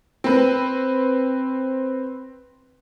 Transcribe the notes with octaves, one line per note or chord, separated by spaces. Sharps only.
C4 B4